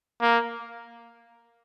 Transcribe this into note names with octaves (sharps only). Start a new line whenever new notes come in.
A#3